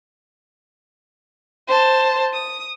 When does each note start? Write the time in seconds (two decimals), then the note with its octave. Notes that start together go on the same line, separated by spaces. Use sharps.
1.68 C5 A5
2.33 D#6